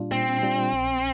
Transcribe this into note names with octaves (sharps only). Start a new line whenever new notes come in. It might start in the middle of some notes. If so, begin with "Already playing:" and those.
Already playing: A#2 G3 D4 F4
A#2 C4
G3 D4 F4
A#1